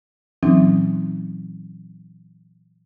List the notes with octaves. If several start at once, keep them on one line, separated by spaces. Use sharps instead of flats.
A#2 E3 F#3 C4 C#4 D#4